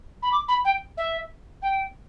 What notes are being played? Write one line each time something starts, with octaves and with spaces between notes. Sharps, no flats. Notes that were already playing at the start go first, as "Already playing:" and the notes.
B5
D6
B5
G5
E5
G5